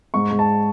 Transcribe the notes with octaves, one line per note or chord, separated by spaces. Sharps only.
G#2 C#6
G#2
A5